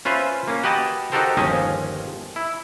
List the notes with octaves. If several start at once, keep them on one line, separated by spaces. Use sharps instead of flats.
C#4 F4 B4 C5 E5
A#3 C#4
F#4 G4 B4 D#5 F#5 A5
D#4 F#4 G4 A4 A#4 C5
G1 D#2 F3 C#4 G#4 D#5
E4